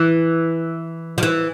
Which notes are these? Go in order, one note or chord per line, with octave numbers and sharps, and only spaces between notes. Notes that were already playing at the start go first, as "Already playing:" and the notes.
Already playing: E3
F3
E3